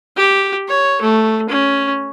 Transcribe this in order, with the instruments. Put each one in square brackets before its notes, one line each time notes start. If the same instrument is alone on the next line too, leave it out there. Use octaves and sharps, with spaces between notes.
[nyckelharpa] G4
C#5
A3
C#4